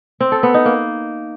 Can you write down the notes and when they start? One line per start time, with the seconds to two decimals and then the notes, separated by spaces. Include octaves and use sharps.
0.20 C4
0.32 A4
0.43 B3
0.54 D#4
0.66 A#3